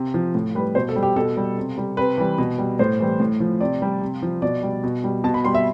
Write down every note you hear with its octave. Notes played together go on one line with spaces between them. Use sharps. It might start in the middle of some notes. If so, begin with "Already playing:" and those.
Already playing: C3
F3
A2
G3 B4
B2 C5
A4
G3
G4
B2 A4
G3
C3
G3
C3 B4
E3 G3
B2
G3
A2 C5
E3 G3
A2
F3
C3 D5
G3
C3
F3
B2 D5
G3
B2
G3
B2 A5
B5
G3 C6
E5